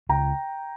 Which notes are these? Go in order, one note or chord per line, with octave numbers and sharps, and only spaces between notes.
C#2 G5 A#5